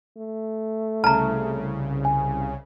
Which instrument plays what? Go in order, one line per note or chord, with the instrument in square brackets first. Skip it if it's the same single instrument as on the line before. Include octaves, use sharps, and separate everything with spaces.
[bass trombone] A3
[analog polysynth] C2 C#3 [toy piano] A5 A#5 [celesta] F6
[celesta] G#5